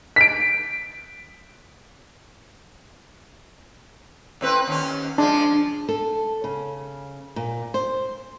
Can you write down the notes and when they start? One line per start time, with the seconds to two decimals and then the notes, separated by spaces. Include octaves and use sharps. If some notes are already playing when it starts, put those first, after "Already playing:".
0.16 B6 D7
4.41 A2 C4 B4
4.67 D#2 C#4
5.18 F3 G#3 D4
5.89 A4
6.44 C#3
7.36 A#2
7.74 C5